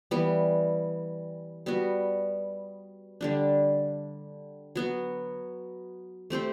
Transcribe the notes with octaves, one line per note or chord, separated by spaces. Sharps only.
E3 G3 B3
G3 B3 F#4
D3 G3 D4
F#3 B3 F#4
A3 C4 G4 C5